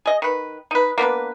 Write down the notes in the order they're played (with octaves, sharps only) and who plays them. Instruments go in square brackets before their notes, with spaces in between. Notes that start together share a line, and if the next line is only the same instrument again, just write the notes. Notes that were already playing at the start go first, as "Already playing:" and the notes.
[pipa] G#4 D#5
D#3 B4
D#4 B4
A#3 B3 D4 B4